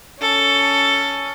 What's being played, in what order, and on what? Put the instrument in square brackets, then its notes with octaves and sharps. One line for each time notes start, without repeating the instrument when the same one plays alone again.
[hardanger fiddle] C#4 A4